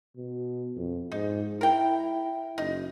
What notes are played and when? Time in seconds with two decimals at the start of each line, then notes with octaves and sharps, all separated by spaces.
0.17 B2
0.76 F2
1.12 G#2 D#4
1.61 E4 A#4 G5
2.58 F#1 D#4